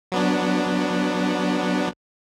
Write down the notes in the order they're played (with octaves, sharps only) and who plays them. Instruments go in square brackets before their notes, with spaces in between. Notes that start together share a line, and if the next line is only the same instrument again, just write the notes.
[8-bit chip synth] F#3 B3 D4